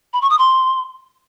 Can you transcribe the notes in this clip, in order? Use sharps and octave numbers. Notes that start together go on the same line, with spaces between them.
B5
C#6
D#6
C6